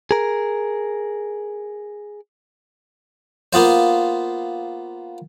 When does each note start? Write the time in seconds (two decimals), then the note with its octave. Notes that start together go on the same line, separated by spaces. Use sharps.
0.11 G#4 A#4
3.53 A#3 B3 F4 C5